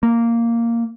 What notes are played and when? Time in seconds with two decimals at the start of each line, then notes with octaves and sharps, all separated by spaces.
0.03 A#3